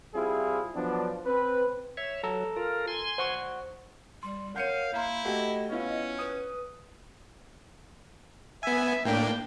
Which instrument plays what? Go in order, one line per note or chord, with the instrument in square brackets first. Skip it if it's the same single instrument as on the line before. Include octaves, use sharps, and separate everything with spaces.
[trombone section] G3 C4 E4 F4 G#4
F3 F#3 B3 D4
C4 B4
[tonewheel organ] C#5 E5
[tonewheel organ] F#3 [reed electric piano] A4 A#5 E6
[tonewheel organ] F4 A#4
G#5 C6
[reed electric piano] C5 F#5 C#6
[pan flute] G3 [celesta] C6
[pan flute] A#4 [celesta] C#5 F#5 [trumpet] F5 [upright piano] G6 C#7 D#7
[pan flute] A#3 [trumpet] E4 [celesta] F5 A#5 C6
[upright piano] A3 F#4 G4 [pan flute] D#5 [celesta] F#5
[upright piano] B3 E4 F4 [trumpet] C#4
[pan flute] B4 [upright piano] D#6
[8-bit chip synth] B3 G#5 [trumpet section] E5
[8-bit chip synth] A2 A#3 D4 [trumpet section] G5